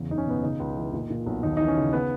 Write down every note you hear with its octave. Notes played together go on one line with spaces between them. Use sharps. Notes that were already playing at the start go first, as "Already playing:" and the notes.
Already playing: E2 C#3
F#1 D#4
C#4
B2 B3
C#3 D#4
C#2
E3
A#2
A#2
B1
D#2 D#4
E3 D#4
C#4
C#3
B3